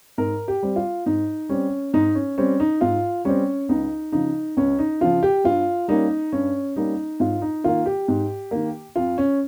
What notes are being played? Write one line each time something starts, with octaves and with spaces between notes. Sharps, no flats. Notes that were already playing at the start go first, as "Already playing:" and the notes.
G#2 A#4
G4
G3 C4
F4
G#2 D#4
G3 C4 C#4
G#2 D#4
C#4
G3 C4 C#4
D#4
G#2 F4
G3 C4 C#4
C#2 D#4
C#3 F3 D#4
C#2 C#4
D#4
C#3 F3 F4
G4
G2 F4
G3 A#3 C#4 D#4
G2 C#4
G3 A#3 C#4 D#4
G#2 F4
D#4
D#3 A#3 F4
G4
G#2
D#3 A#3
F2 F4
C#4